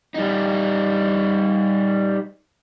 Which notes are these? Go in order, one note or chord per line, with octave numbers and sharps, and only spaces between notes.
G3 D#4